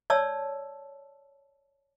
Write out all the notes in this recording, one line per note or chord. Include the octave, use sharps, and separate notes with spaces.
C#5 D5 A5 E6